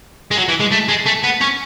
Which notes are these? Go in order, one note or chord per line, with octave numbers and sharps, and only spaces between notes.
G#3
F#3
E3
G#3
A3
G#3
A3
B3
C#4